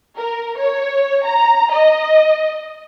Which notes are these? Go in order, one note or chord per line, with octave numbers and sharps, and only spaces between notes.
A#4
C#5
A#5
D#5